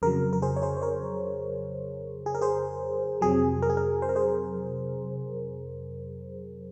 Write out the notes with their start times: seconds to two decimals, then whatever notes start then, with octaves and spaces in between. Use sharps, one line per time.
0.02 F2 C#3 F#3 A#4
0.33 A#4
0.42 G#4 C5
0.56 C#5
0.62 G#4 C5
0.77 C5
0.82 A#4 C#5
2.26 G#4
2.34 A#4
2.41 G#4 C5
3.21 F2 C3 F#3 G#4
3.62 A#4
3.70 G#4
3.77 A#4
4.02 C5
4.09 A#4
4.16 G#4 C5